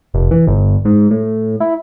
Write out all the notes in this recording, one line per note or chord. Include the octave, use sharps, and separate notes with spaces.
F1
E3
G1
G#2
A2
E4